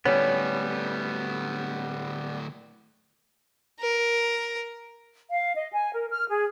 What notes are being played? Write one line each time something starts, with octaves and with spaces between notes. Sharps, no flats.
D2 A2 G3 B3 C#4
A#4
F5
D#5
G#5
A#4
F6
G#4